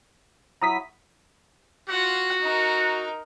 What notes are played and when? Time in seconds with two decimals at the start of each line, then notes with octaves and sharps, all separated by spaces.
0.62 F#3 E4 A#5 D#6 B6
1.89 F4 F#4 F#5
2.41 D#4 A#4